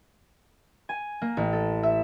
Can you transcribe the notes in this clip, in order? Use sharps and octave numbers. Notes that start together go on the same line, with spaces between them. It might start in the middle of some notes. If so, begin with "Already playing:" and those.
G#5
A#3
A1
A4
E5